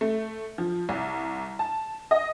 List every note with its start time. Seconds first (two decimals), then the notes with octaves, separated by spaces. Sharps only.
0.01 A3
0.58 F3
0.89 C2
1.59 A5
2.11 D#5